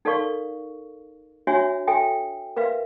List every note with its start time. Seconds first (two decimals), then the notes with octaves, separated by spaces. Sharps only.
0.05 D#4 A4 A#4 D5 F5 C#6
1.47 D4 F#4 C#5 E5 G#5
1.87 A4 E5 G5 G#5
2.56 A#4 B4 E5 F5